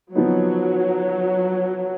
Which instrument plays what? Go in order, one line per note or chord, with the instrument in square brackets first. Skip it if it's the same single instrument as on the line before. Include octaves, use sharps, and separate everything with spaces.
[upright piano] F3 B3 D#4 [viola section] F#3